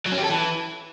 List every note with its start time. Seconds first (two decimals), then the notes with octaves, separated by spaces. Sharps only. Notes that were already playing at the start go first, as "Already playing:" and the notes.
0.06 F#3
0.12 C#4
0.18 G4
0.24 A4
0.30 E3